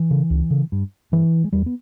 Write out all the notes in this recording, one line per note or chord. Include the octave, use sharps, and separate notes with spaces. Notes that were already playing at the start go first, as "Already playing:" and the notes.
Already playing: E3
C#3
C#2
C#3
G2
G2 E3
G#3
E2 G3
B3